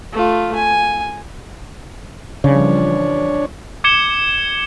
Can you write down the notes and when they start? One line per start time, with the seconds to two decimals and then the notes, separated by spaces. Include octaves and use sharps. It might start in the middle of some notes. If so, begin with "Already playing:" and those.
0.13 A3 F4
0.55 G#5
2.44 C#3 E3 F3 G3 D4 C#5
3.84 D6 G#6 C#7 E7 G7